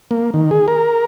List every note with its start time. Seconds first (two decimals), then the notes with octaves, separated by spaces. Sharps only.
0.11 A#3
0.34 D#3
0.51 G#4
0.68 A#4